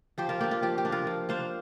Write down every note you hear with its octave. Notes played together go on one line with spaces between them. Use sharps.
F3 G4 C5
F4 A#4
A#3 D4 G4
F4
F3 G4
G4
A#3 D4
F4 A#4
F3
A#3 D4 C5 F5